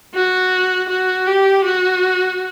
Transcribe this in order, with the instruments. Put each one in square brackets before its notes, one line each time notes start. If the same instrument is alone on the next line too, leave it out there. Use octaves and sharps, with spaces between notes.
[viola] F#4
F#4
G4
F#4